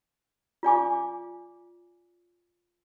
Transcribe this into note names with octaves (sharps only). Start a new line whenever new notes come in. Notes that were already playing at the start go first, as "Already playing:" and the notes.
F4 D5 G#5 D6